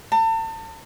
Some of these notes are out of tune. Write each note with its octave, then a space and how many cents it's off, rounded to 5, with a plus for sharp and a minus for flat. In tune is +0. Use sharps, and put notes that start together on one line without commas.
A5 +40